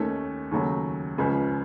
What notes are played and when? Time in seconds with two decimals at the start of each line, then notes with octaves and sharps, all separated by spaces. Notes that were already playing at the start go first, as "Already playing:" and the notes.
Already playing: D#2 D#3 A3 C#4
0.51 D#2 C#3 F#3 A3
1.18 C#2 C#3 F3